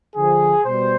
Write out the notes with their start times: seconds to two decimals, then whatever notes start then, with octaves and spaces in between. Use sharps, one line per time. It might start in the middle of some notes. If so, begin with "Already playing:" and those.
0.16 D3 F3 G#4
0.63 B2 G3 C5